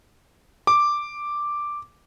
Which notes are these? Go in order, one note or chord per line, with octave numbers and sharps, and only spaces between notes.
D6